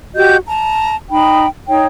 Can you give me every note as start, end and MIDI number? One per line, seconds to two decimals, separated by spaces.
0.15 0.37 66
0.15 0.37 67
0.15 0.37 75
0.15 0.37 91
0.47 0.96 81
0.47 0.96 82
1.10 1.46 63
1.10 1.46 79
1.10 1.46 83
1.68 1.87 63
1.68 1.87 73
1.68 1.87 79